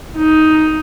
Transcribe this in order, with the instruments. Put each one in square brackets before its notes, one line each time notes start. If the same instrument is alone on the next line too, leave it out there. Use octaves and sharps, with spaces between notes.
[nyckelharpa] D#4